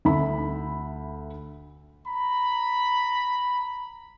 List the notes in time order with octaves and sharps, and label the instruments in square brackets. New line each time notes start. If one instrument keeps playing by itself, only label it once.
[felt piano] D2 E5 B5
[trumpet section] A#5 B5